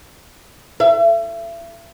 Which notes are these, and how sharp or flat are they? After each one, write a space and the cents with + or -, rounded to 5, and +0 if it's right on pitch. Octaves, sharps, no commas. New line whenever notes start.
E5 +40